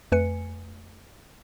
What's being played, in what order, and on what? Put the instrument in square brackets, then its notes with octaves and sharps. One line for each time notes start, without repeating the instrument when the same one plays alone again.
[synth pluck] F2 A3 B4 G#5 C#7